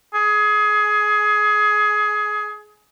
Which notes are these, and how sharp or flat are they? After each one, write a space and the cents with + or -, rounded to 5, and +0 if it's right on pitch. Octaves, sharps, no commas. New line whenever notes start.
G#4 +20